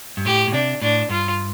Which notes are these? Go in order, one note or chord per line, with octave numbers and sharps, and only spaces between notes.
G2
A2 G4
A2
C3 D4
A2 D4
G2 F4